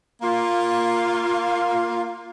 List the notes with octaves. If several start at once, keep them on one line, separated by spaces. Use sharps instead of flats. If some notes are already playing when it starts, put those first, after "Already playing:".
A#3 F4